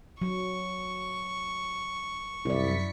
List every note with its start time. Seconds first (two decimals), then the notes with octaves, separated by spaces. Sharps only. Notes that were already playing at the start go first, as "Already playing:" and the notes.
0.22 F#3 C#6
2.45 C2 F#2 E4 D5 B6 C#7